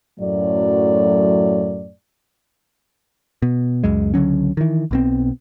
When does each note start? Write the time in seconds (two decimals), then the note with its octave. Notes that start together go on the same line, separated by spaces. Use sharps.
0.20 F#2 A2 F#3 A3 D5
3.42 B2
3.84 C#2 F#2 G#3
4.14 C#2 D3 F#3 C#4
4.57 D#3 E3
4.91 B1 B2 C4